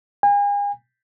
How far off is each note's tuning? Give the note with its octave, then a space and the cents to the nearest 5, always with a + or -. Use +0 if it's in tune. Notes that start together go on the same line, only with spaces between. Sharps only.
G#5 -40